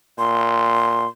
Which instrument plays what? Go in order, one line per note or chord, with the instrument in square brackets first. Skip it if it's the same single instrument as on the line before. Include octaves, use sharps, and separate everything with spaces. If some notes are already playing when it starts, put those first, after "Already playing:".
[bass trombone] A#2 [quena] C6